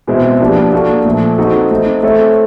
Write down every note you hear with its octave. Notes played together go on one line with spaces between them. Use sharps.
B2 G#3 C4 E4
F3 A#3 D4 G4 B4
A#3 D4 F#4 A4
A#2 F3 A3
C4 D#4 F#4 A4
A3 C4 D#4
A3 C4 E4 A4 C#5